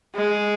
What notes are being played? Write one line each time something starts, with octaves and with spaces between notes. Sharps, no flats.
G#3